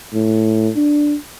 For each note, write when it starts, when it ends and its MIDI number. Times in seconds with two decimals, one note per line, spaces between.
0.14 0.70 45
0.76 1.16 62